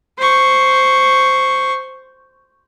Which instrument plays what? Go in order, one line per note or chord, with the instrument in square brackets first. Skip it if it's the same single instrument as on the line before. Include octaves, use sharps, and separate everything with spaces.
[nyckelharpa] C5 C#6